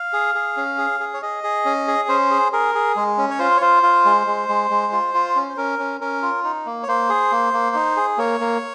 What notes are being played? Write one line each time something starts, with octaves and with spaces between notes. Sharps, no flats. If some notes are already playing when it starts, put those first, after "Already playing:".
Already playing: F5
G#4
G#4
C#4
G#4
G#4
C#5
G#4 D#5
G#4
C#4
G#4
C#4 C5
G#4
G#4 A#4
G#4
G#3
C#4
C#5
F4 C5
C#5
F4 C5
F4
G#3
G#3
G#3
G#3
F4
F4
C#4
C5
C#4 A#4
C#4
C#4 A#4
F4
D#4
A#3
C#5
A#3 C5
G#4
A#3
A#3
D#4
G#4
A#3 C#5
A#3